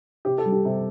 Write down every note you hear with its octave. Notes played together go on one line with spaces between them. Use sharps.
C3 G4
A4
G3
G4
C3